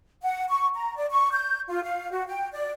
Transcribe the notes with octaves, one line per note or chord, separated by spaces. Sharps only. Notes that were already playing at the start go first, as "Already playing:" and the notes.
F#5
C#6
A#5
D5
C#6
G6
F4
F5
F#4
G5
D5